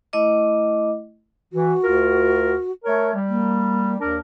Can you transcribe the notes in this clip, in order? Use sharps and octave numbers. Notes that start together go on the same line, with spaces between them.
A3 E4 D#5 D6
E3 F#4
D2 F4 A#4
A3 A#4 C#5
G3
A#3
D#2 D4 A#4